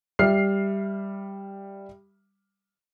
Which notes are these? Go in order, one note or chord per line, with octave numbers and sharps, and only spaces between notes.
G3 E5 F6 C7